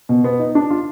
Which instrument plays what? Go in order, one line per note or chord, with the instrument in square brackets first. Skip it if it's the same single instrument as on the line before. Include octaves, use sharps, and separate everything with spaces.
[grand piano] B2
B3
D#4
D4
F4